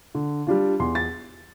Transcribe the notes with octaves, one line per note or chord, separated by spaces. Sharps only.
D3
G3 D4 F4
E2 C6
A6